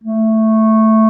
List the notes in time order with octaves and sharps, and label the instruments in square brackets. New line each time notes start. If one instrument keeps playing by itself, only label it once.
[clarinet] A3